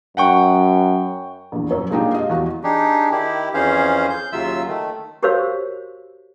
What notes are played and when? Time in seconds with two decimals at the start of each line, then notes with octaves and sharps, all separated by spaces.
0.17 F#2 F#5 G5 C#6
1.52 A#1 E2
1.71 F#2 C#5
1.90 A#2 G#3 D4 D#4 F4 G4
2.14 D#5 F5
2.29 E2 F#4
2.64 D4 D#4 G4 G#4
3.12 D#3 E4 G4
3.54 F2 E3 C#4 G#4 C5 F5
4.10 G6
4.32 D#2 C#3 F#3 F4 E5 E6
4.67 D#3 A3
5.23 F#4 G4 A#4 C5 C#5 F5